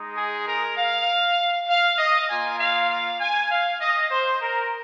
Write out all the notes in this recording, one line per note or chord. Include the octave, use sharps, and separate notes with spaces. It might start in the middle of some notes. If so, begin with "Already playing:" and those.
Already playing: G#3 D#4
G#4
A#4
F5
F5
D#5
A#3 F4 G#5
F5
F5
G#5
F5
D#5
C5
A#4